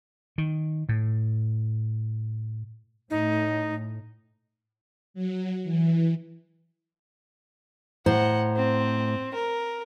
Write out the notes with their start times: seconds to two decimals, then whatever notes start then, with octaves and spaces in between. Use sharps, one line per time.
0.38 D#3
0.89 A2
3.10 A2 D#4
5.14 F#3
5.63 E3
8.06 A2 C5 F#5 A#5
8.56 C4
9.34 A#4